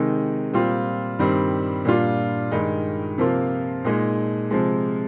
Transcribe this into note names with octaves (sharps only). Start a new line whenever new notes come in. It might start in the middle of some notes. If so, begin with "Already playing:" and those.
Already playing: C3 D#3 G#3 D#4
A#2 G3 C4 F4
G2 D#3 G3 C4
A#2 G3 D4 F4
G2 D#3 G#3 D#4
C3 F3 A#3 F4
A#2 G#3 D#4
C3 F3 G#3